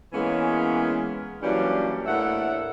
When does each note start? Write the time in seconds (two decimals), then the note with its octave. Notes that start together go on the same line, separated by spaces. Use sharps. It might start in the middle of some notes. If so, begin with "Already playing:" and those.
0.13 E3 G#3 A#3 B3 C#4
1.42 E3 F#3 G3 A#3 C#4 D4
2.06 A2 A#3 D4 E5 F#5